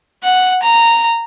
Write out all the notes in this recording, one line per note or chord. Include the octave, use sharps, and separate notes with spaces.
F#5
A#5